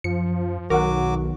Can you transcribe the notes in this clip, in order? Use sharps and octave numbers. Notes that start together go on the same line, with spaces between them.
F#2 F3 C#7
B1 D#3 F#3 F#4 A#4 F#5 D6